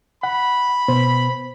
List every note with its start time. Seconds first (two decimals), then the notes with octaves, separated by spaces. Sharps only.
0.23 F#5 B5
0.88 B2 B3 C5